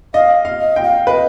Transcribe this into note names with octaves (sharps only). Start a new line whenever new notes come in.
D#5 F5
F5
D#5
G5
F5
B4 D#5